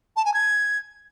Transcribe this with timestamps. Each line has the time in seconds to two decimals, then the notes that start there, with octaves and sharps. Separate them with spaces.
0.16 A5
0.25 G#5
0.34 G#6